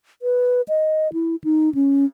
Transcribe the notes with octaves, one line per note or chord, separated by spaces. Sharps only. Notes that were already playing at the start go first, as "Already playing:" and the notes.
B4
D#5
E4
D#4
C#4